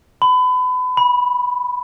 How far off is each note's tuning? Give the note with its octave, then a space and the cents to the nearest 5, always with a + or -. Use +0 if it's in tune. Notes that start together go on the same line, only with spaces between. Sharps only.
B5 +30
B5 -10